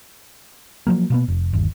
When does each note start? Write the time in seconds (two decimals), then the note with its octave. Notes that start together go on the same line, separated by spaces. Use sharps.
0.87 F3 F#3 A#3
1.10 B2 A#3 B3
1.28 F1
1.53 G1 D#2